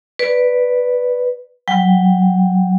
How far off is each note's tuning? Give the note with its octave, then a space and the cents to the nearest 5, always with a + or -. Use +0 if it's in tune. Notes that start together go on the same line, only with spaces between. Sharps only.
B4 +0 D5 +0
F#3 +0 G5 +0